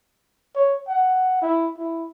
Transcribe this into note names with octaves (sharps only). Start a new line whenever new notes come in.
C#5
F#5
E4
E4